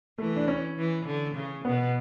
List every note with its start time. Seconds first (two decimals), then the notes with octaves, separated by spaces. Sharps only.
0.18 E3 A3
0.36 D4
0.48 C#4
0.78 E3
1.06 D3
1.35 C#3
1.65 B2 B3